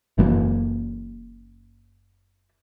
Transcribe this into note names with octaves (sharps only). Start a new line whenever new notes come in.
F#1 F#2 E3 A#3